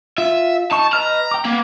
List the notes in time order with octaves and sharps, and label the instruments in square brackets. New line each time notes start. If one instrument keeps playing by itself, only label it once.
[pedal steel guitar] F4 [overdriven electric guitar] E5
[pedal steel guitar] D#4 C#6 [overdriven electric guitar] A5
[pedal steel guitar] B4 D#5 F6 [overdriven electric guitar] A#5
[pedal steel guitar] G5 D6
[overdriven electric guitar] A#3 [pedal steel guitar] B3